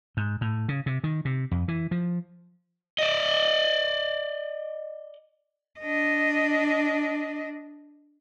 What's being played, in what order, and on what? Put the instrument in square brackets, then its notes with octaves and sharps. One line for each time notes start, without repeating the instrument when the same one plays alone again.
[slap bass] G#2
A2
C#3
C3
D#3
C3
F2
E3
F3
[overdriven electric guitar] D5 D#5
[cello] D4 D#5